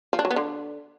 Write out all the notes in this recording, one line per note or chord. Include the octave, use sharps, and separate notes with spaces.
F3
D4
F#3
B3
D3